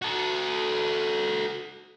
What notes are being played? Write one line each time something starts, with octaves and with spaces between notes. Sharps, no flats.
F#4 A4